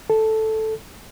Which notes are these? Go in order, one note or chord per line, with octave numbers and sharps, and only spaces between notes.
A4